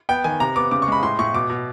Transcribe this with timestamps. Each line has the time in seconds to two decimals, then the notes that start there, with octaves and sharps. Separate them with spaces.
0.09 B3 G5
0.24 D#3 G#5
0.40 C3 A#5
0.56 B3 D6
0.71 C#3 D6
0.82 C#6
0.88 G#3 B5
1.02 A2 C6
1.19 A2 C#6
1.34 B2 D6
1.50 B2